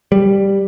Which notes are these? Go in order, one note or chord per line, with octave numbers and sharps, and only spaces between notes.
G3